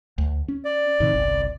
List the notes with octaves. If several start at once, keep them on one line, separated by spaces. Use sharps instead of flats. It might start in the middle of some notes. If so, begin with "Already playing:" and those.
D2
C#4
D5
A2 C3 D#3
G1 C2